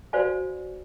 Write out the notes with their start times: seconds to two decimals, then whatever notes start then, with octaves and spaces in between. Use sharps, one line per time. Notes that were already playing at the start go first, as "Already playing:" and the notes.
0.13 F#4 B4 C5 D5 F5 G#5